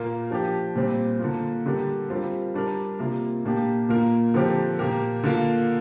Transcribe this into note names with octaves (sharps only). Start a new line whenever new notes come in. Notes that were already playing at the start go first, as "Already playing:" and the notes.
Already playing: A#2 A#3 F4 A#4
F3 D4 G4
A#2 G3 C4
D3 A#3 F4
D3 G3 D4 G4 A#4
G3 C4 F4 A#4
G3 D4 A#4
C3 A#3 F4 A#4
A#2 A#3 D4 G4
A#2 A#3 F4 A#4
D3 F3 C4 G4 A#4
A#2 A#3 G4 A#4
D3 A#3 F4 A#4